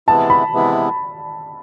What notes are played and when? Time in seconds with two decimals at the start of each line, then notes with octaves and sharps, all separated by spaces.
0.07 C3 E3 G#3 B3 E4 A5
0.30 B5
0.52 C3 E3 G#3 B3 E4